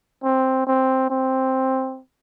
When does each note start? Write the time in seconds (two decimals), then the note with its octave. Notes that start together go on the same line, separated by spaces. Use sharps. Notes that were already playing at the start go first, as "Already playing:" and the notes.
0.24 C4
0.67 C4
1.10 C4